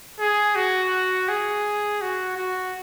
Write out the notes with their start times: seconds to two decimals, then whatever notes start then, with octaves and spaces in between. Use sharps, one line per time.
0.20 G#4
0.56 F#4
1.29 G#4
2.01 F#4
2.38 F#4